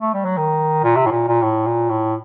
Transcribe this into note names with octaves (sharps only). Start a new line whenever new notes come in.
A3
G3
F#3
D#3
A#2
C3
A2
A#2
A#2
A2
A#2
A2